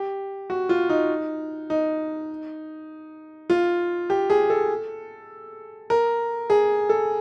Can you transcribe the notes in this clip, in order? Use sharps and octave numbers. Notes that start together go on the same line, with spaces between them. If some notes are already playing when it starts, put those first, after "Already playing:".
Already playing: G4
F#4
F4
D#4
D#4
F4
G4
G#4
A4
A#4
G#4
A4